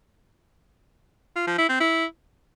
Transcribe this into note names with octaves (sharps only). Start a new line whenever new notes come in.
F4
F3
E4
C4
E4